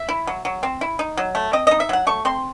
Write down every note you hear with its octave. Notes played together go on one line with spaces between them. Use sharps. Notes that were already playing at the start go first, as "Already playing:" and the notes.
Already playing: E5
E4
F#3
F#3
C4
E4
D#4
F#3
A3
C4 D#5
D#4 D#5
E5
F#3 F#5
A3 C#6
C4 C6